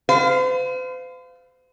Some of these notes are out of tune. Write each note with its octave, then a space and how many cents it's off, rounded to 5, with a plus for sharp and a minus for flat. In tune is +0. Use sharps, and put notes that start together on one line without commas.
C5 -45 F5 +0